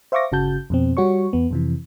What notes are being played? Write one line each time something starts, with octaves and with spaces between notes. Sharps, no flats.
C5 E5 F5 C#6 D6 A#6
G1 C#3 F#4 A5 G6
F2 B2 C4
G3 F#4 C#5 C#6
E2 B3
F2 C3 E3